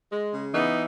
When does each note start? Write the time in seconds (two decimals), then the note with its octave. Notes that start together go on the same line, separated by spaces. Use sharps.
0.12 G#3
0.32 C#3
0.53 E3 B3 D#4